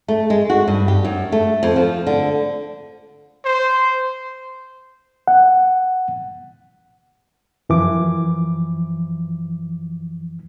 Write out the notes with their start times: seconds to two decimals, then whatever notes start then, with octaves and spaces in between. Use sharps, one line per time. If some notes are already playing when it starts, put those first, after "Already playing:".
0.08 A3
0.30 G#3
0.50 F#4
0.67 G2
0.88 G4
1.04 F#2
1.32 A3
1.63 F2
1.76 F3
2.07 D3
3.45 C5
5.28 F#5
7.69 F#2 E3 F3 D6